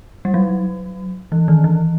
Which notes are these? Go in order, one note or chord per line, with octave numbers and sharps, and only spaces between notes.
G3
F#3
E3
D#3
E3